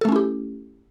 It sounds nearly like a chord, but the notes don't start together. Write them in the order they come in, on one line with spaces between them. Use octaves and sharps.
A4 A3 C#4 E4 G4